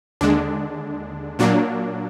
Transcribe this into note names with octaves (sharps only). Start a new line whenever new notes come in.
D#2 D3 G#3 D4
A#2 F#3 A#3 D4